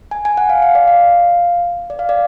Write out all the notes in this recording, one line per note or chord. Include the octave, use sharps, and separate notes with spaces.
G#5
G#5
F#5
F5
F5
D5
F5
D5
F5
D5